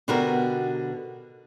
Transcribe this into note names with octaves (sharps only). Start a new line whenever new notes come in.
B2 D3 B3 F#4 G4 A#4